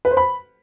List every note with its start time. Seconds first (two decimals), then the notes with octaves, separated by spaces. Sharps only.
0.05 B4
0.11 C5
0.17 B5